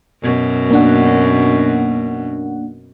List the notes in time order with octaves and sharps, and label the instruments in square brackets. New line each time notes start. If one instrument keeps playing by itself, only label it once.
[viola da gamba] F#2 B2
[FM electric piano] A#3 D4 F#5